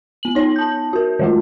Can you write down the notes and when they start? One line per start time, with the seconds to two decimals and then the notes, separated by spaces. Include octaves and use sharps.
0.23 B3 F#7
0.35 D#4 C#5
0.56 A5 G6
0.93 F#4 A#4
1.19 D#3 F#3 G#3 A3 F4